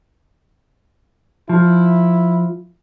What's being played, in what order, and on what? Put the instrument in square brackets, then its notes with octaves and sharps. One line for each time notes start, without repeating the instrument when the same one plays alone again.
[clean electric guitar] F3 [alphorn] E4